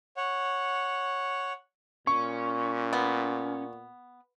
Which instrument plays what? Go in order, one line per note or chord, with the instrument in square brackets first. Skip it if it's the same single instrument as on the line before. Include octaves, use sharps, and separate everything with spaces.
[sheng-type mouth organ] C#5 F#5
[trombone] A#2 [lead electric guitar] C#4 [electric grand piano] C#6
[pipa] B3